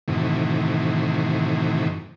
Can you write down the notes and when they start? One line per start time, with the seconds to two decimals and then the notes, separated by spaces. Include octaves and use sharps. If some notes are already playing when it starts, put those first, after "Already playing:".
0.08 F#2 A2 C3 D#3 E3